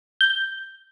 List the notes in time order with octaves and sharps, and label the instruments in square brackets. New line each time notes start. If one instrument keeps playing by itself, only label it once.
[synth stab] G6